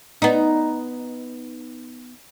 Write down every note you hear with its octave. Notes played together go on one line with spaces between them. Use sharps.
B3 D#4